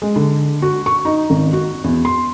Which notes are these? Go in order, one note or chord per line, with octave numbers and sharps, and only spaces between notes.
G#3
D3
F#4
C#6
D#4
G#1
F#4
E2
C6